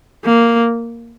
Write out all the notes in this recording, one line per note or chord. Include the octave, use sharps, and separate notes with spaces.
A#3